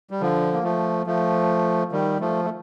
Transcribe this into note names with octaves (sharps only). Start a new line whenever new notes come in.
G3
D3 F3
A#3
F3 A3
F3 A3
D#3 G3
F3 A3
A3